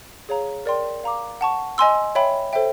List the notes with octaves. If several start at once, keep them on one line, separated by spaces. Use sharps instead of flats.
G#4 C#5 F5 A#5
A#4 D5 G5 C6
F5 A#5 D6
F#5 A5 C#6
D#5 G#5 C6 E6
C#5 E5 G5 B5
A4 C5 E5 G5